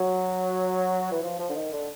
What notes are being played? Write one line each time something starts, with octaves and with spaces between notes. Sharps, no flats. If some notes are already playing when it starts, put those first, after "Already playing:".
Already playing: F#3
E3
F3
F3
D3
D#3
D3